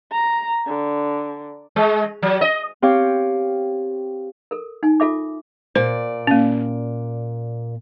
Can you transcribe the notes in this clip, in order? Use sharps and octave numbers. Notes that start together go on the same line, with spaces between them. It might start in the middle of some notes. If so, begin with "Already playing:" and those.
A#5
D3
G#3
F#3
D#5
C4 G4 C#5 F5
A4 A#4
D#4 G#5
F4 A4 E5 D6
A#2 C5 D5
A#3 C#4